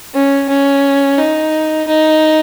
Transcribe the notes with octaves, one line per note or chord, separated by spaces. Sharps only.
C#4
C#4
D#4
D#4